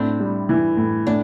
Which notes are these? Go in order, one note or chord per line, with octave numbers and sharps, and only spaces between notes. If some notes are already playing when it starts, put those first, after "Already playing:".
Already playing: A2 C4 D4
G3
E3
A2
A2 D4